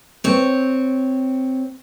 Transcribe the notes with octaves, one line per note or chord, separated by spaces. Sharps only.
C4 C#5